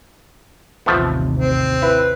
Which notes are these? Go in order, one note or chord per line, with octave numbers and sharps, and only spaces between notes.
A1 D#2 C3 F3 A3 B3
C4
E4 B4